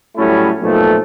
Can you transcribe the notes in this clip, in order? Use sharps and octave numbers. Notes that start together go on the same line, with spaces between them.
A2 F#3 G3 A3 C#4 E4
B1 A#2 F3 A3